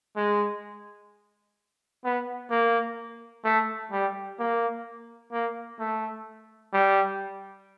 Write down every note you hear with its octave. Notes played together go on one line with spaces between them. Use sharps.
G#3
B3
A#3
A3
G3
A#3
A#3
A3
G3